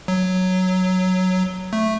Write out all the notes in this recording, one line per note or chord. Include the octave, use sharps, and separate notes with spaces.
F#3
A3